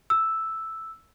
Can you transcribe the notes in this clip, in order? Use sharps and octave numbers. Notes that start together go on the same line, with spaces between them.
E6